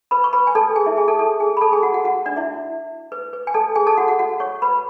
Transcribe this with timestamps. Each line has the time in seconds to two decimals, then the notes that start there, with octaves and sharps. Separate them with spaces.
0.11 B4 B5
0.24 C#6
0.33 B4 B5
0.47 G#5
0.55 A4 A5
0.76 G#4 G#5
0.86 E4 E5
0.97 G#4 G#5
1.08 A4 A5
1.19 A4 A5
1.40 G#4 G#5
1.57 B5
1.61 A4 A5
1.72 G#4 G#5
1.83 F#4 F#5
1.94 F#4 F#5
2.04 F#4 F#5
2.26 D4 D5
2.36 E4 E5
3.12 B4
3.33 B4
3.47 G#5
3.54 A4 A5
3.76 G#4 G#5
3.87 A4 A5
3.97 F#4 F#5
4.08 F#4 F#5
4.19 F#4 F#5
4.40 C#5 C#6
4.62 B4 B5